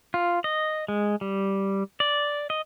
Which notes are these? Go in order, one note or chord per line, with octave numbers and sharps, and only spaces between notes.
F4
D#5
G#3
G3
D5
D#5